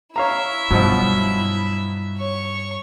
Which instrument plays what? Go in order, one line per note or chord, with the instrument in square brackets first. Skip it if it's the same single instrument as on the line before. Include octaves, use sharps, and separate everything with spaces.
[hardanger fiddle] E4 E5 [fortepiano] C#5 F5 A#5
[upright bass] G2 [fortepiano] B2 F3 F#3
[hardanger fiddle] C#5 C#6